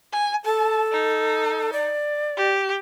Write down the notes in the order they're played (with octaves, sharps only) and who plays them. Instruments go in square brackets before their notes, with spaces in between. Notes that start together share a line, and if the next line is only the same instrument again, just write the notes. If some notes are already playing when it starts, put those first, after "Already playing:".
[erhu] G#5
[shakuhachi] A4 [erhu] A5
[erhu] D#4
[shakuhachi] D5
[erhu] G4